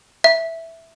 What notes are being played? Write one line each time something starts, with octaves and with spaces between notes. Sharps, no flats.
E5